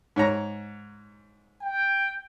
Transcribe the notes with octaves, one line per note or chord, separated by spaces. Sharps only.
G#2 C#5 A#5
G5